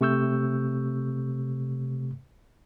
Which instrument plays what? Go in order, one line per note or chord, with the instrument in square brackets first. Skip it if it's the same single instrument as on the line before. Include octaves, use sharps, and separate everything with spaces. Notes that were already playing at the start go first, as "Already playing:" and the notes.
[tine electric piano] C3 A3 C#6 E6 G6